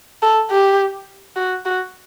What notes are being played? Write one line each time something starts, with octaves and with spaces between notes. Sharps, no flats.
A4
G4
F#4
F#4